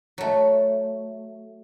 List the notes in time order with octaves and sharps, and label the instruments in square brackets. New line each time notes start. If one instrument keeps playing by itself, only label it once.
[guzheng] F#3 A3